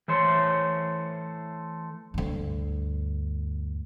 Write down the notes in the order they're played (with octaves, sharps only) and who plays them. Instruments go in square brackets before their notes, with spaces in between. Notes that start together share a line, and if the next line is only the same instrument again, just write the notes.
[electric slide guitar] E3 A3 C5 C#5
[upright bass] D2 G2